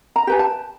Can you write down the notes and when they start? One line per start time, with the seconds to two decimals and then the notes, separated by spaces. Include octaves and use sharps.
0.16 A#5
0.27 G4 B4 G#5
0.39 A5